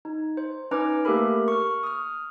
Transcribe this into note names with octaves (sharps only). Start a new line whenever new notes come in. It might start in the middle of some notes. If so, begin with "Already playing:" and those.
D#4
C5
C#4 D#4 B4 A#5 D6 F6
A3 A#3 G4 A4 A#4 B5
C#6 F6
D#6 F6